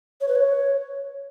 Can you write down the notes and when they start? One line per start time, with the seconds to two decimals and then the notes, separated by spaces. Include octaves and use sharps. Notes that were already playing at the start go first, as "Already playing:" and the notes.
0.21 C#5
0.28 B4
0.35 C#5